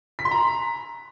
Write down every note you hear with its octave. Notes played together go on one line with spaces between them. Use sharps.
B6
C6
A#5